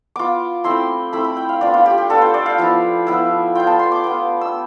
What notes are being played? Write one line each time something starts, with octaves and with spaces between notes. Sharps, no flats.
B3 F4 D6
A3 C4 E4 C6
A3 C4 E4 B5
B5
G5
F5
B3 D4 F4 D5
F4
G4
G4
B3 D4 F4 A4
C5
D5
F5
F3 B3 E4
F3 B3 E4
B3 F4 G5
A5
C6
D6
B3 F4
E6